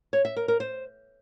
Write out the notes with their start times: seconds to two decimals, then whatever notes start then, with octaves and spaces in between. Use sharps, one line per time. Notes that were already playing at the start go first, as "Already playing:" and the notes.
0.13 C#5
0.25 E5
0.36 A#4
0.48 A#4
0.60 C5